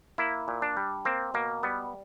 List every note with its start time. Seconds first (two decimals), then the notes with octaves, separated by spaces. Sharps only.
0.18 A#3 E4
0.48 A#2
0.62 D4
0.77 G3
1.05 A#3 C4
1.34 B2 A#3
1.63 G3 B3